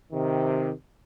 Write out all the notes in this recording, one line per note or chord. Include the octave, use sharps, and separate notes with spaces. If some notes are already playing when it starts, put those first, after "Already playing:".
C3 D#3